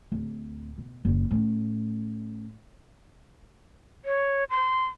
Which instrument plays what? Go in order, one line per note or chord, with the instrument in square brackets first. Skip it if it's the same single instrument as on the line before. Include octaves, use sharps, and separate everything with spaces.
[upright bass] D1
B2
F#1 A#2
A2 C#4
[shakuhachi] C#5
C6